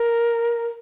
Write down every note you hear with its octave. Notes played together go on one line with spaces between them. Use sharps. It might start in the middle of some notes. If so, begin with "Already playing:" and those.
Already playing: A#4